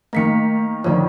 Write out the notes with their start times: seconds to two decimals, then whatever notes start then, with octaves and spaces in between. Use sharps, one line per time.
0.13 D#3 A3 A#3 B6 C#7
0.84 F2 D3 D#3 C#5 D5